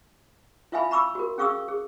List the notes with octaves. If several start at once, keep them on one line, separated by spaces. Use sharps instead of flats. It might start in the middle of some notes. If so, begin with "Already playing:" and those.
E4 F4 E5 F5 G#5 B5
A#5 B5 C#6 D6 E6
F#4 A#4
C#4 G#4 F5 C#6 D#6 E6
G#4